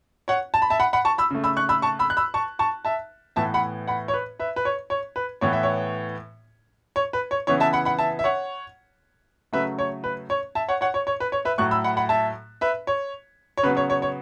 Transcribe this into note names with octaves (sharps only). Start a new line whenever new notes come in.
C#5 F#5
A5
B5
E5 A5
F#5 B5
F#5 B5
A5 C#6
B5 E6
C#3 A3
B5 E6
C#6 F#6
B5 E6
A5 C#6
B5 E6
F#6
B5 E6
A5 C#6
A5 C#6
E5 A5
A2 E3 B3 E5 A5
F#5 B5
F#5 B5
C#5
B4
B4 E5
B4
C#5
C#5
B4
A2 E3 B3 C#5
E5
C#5
C#5
B4
C#5
C#3 E3 B3 C#5
E5 A5
F#5 B5
F#5 B5
E5 A5
E5
C#5 F#5
C#3 F#3 A3 B4 E5
C#5
B4
C#5
E5 A5
C#5 F#5
C#5 F#5
C#5
C#5
B4
C#5
B4 E5
A2 F#3 A3 C#6 F#6
B5 E6
F#5 B5
F#5 B5
E5 A5
B4 E5
C#5
C#5
C#3 F#3 B3 B4
C#5
C#5
C#5